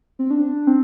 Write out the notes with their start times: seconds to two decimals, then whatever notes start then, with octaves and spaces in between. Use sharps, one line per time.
0.19 C4
0.31 D4
0.67 C4